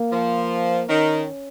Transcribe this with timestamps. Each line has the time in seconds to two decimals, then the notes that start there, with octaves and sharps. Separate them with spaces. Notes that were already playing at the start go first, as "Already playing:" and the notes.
Already playing: A#3
0.11 F3
0.88 D#3 C#4